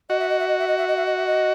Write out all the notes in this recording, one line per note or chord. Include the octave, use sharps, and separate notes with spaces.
F#4 D#5
E5
D#5
E5
D#5
E5
D#5
E5
D#5
E5
D#5
E5
D#5